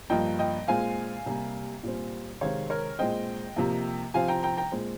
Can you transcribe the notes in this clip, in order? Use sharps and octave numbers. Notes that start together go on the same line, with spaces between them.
G2 F3 A#3 D#5 G5
D#5 G5
A#2 G#3 C4 F5 G#5
C3 G3 A#3
A#2 G3 C4
C3 D#3 G#3 C4 C#5 F5
A#4 C#5
A#2 G#3 C4 D#5 G5
C3 F3 A#3
C3 F3 C4 F5 G#5
G5 A#5
G5 A#5
G5 A#5
A#2 G#3 C4